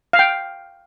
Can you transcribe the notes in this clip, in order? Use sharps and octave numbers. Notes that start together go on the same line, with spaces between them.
F5
G5